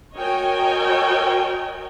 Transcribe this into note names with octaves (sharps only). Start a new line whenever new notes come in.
F#4 A#4 C#5 D#5 G5 G#5